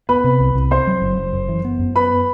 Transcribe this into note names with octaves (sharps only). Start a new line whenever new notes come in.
B3 B4 B5
C3
C2
C2
C4 C5 C6
F#3
F#1
F#1
F#2
E3
B3
F#2
B3 B4 B5